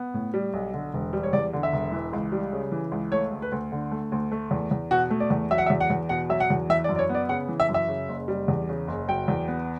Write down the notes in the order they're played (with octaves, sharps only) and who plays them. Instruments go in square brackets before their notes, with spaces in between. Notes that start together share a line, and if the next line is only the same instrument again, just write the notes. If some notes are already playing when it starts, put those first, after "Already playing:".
Already playing: [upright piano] B3
A2
G3
B1
D3
E1
G3
C#5
E2 D5
D3
E5
E1
E3
C#2
G3
C#3
E3
C#2
A3 C#5
D2
B4
D2
D3
A3
D2
A3
E2
E2
B2 F#4
A3
D5
E2
F#3 E5
F#5
E5
E2
F#5
E2
B2 F#5
F#3 E5
F#5
E2
E3 E5
D5
F#2
D5
C#5
B3
D5
C#3 F#5
E3
E5
F#2
E5
C#3
F#1
G3
E2
C#3
F#1
F#3 G5
E2
B3